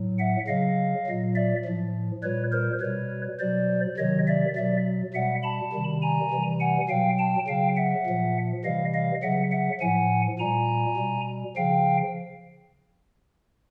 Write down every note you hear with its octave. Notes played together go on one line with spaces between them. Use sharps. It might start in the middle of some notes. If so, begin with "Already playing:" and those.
Already playing: A2 F#3
E5 F#5
C#3 F#3 D#5 F5
A#2 F#3
D5 E5
A2 F3
A#2 G3 B4 C#5
A#4 C5
B2 G3 B4 C#5
B2 F#3 C5 D5
C3 D#3 F#3 C#5 D#5
D5 E5
B2 F#3 D5 E5
B2 G3 E5 F#5
A5 B5
C3 D#3 G3
G#5 A#5
C3 E3 G3
F#5 G#5
B2 F#3 F5 G5
G5 A5
C#3 F#3 F5 G5
E5 F#5
A#2 F3
C3 E3 G3 D#5 F5
D#5 F5
C#3 F#3 E5 F#5
E5 F#5
A2 F3 F#5 G#5
A#2 G3 G#5 A#5
B2 G3
C#3 F3 F5 G5